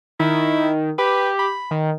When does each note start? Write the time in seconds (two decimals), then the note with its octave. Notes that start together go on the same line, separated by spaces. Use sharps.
0.20 D#3 E4
0.98 G4 B4
1.39 B5
1.71 D#3